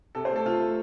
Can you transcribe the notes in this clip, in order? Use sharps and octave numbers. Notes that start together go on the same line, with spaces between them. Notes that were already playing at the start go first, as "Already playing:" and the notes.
C3 A4
C5
A3
A4
C3 F4
A3